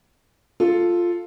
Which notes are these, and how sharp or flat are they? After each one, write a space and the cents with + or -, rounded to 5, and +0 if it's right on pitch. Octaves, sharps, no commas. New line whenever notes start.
F4 +0 A4 +0